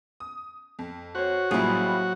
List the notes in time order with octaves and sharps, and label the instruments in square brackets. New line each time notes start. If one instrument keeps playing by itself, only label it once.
[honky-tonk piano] D#6
F2
[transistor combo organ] F#4 [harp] C5 C#5
[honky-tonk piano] A1 G3 F4 [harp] F#3 A#3 [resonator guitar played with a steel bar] E4 G#4